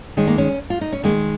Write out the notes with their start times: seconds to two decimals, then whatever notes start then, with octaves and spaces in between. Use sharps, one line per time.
0.17 D#3 G#3 C#4
0.27 A#3
0.38 C#4
0.70 F4
0.81 D#4
0.93 C#4
1.03 D#3 G#3 A#3